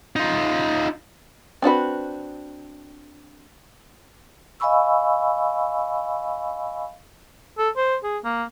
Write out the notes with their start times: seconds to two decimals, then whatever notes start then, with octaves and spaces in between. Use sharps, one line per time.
0.16 D#4 F4
1.62 C4 D4 F#4 B4
4.60 D#5 F5 G#5 B5 C#6 E6
7.58 A4
7.77 C5
8.04 G#4
8.25 A#3